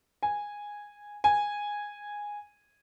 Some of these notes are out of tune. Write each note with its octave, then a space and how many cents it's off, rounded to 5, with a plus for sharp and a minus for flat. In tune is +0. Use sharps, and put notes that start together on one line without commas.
G#5 -10
G#5 -10